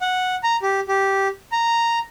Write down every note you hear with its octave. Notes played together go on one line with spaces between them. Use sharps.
F#5
A#5
G4
G4
A#5